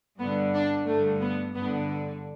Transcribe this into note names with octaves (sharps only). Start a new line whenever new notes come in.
G2 D3 B3
D4
G2 D3 A3
B3
G2 D3 B3